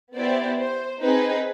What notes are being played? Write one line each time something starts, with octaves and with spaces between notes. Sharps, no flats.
B3 E4 G4 C5 D5
C5
C4 D#4 G#4 B4